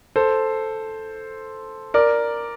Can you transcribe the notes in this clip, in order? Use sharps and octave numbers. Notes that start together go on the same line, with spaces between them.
A4 C5
A#4 D5